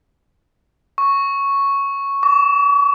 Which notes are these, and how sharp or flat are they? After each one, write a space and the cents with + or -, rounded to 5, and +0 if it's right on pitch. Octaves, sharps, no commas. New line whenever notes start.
C#6 +0
C#6 +45